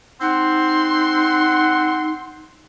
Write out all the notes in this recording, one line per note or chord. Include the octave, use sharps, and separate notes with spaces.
C4 D#4 F#5 C6